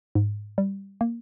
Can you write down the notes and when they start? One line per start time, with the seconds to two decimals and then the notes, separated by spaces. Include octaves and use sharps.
0.15 G#2
0.58 G3
1.01 A#3